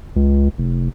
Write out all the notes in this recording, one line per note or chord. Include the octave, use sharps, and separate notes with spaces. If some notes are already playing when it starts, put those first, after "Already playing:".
C#2
F1